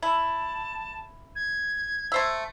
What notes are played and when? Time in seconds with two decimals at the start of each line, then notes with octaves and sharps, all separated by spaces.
0.02 E4 A5
1.35 G#6
2.12 A3 C5 E5